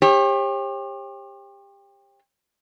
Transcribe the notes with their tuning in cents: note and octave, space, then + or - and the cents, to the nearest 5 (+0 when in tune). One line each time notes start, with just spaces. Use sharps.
G4 +25 C#5 -45